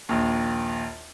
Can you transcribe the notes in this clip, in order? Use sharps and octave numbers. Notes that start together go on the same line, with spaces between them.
A#1 D#2